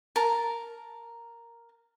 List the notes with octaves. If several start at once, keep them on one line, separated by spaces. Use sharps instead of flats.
A#4 A5